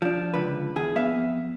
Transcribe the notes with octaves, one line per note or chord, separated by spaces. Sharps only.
F3 D4
C#2 D3 B4
E2 G#4
F2 B3 E5 F5